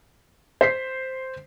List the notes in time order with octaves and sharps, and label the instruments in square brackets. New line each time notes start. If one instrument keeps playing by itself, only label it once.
[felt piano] C5 B6 C7